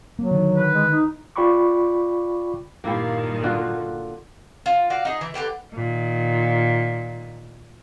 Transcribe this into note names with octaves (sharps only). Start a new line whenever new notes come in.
F#3 A#3
D3 D#3
B4
G#3
D#4
F4 D5 G5 B5 C#6 D6
G2 A#2 D#3 A#3 E4 G4
D3 F4 F#4
F4
F#4 D5 F5
D#4 G#4
E3
D3 B3 G4 B4
A#2 D#3